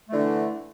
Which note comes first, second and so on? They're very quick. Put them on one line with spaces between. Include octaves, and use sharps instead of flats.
A3 E3 D3